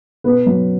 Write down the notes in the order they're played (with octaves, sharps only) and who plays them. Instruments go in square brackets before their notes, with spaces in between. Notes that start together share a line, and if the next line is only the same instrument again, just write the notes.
[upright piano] B2 B4
F#3